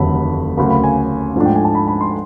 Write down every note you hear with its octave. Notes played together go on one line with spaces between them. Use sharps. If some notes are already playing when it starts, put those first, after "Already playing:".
Already playing: F1 D#2 D3 F#3 A3 B5
D2 C#3 F#3 A#3 B5
B5
G#5
G#2 F3 A3 D4
G5
G#5
A5
B5
B5
C6